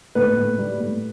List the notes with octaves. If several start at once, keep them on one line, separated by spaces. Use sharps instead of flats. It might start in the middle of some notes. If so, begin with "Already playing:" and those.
A2 B4
A2
G3
A2